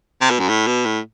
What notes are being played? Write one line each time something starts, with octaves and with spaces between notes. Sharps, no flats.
C3
B2
F#2
A2
B2
A2